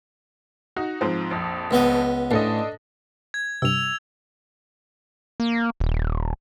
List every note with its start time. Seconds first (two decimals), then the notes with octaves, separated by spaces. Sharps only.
0.76 D#4 F#4
1.01 G#2 F3 C4
1.31 A#1 F2
1.71 C#2 B3 D#5
2.31 A1 D4 A4 D#5
3.34 G#6
3.62 G2 C3 E6 F7
5.40 A#3
5.80 D#1